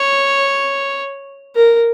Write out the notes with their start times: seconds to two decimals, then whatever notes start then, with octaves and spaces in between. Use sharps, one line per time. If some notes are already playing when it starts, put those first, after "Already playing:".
Already playing: C#5
1.56 A#4